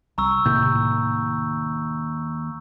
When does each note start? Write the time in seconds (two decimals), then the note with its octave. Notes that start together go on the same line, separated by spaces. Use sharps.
0.18 C2 A#5 C#6 E6
0.46 D#2 A2 C3 D#3 G6